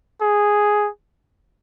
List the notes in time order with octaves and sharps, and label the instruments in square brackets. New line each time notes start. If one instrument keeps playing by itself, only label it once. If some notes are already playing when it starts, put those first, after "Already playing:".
[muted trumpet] G#4